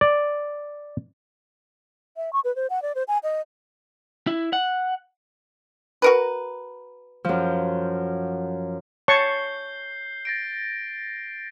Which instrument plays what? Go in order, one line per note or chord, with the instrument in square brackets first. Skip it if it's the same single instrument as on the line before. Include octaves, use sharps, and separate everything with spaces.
[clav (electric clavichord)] D5
[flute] E5
C#6
B4
C5
F#5
D5
C5
G#5
D#5
[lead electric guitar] E4
F#5
[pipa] F#4 A#4 B4
[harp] F#2 F3
[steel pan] C#5 A5 C#6 [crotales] G6 C7 G7
[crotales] A6 A#6 D7